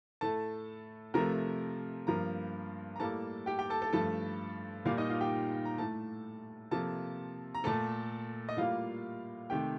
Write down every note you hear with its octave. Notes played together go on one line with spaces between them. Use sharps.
A2 A3 A4 A5
C3 F3 A3 A#4 A#5
G2 F3 A#3 A#4 A#5
A#5
A2 G3 A#3 A4 A5
G4 G5
G4 G5
A4 A5
A4 A5
G2 F3 A3 A4 A5
A#2 G3 A#3 F4 F5
D#4 D#5
F4 F5
G4 G5
A#5
A2 A3 A4 A5
C3 F3 A#3 A4 A5
A#5
A#2 A3 A4 A5
D#5
A2 G3 A#3 F4 F5
C3 D#3 A3 G4 G5